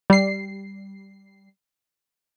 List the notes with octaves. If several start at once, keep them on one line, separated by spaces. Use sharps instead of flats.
G3 C7